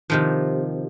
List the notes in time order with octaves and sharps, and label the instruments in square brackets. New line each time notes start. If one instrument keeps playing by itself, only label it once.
[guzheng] C3 D#3 F3